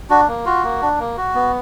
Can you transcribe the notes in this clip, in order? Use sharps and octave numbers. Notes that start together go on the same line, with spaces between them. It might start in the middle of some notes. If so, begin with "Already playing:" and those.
D4 F#4
A#3
F4 F#4
A#3
D4
A#3
F#4
B3